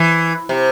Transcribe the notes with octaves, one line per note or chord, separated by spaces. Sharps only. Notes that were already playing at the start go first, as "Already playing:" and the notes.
Already playing: E3
C3